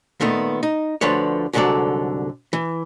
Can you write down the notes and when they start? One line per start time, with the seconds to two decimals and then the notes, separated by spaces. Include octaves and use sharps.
0.21 A#2 D#3 A3 B3
0.63 D#4
1.01 D2 D3 F3 B4 C#5
1.53 C2 G#2 D3 F#3 A4 D5
2.53 E3